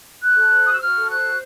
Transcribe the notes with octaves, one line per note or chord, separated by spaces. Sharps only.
F#4 F#6
A4
C5
F#4 D#6
E6
F#4 F6
A4
C5 F#6
F#4